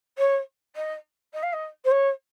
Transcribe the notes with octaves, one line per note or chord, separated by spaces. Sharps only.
C#5
D#5
D#5
F5
D#5
C5
C#5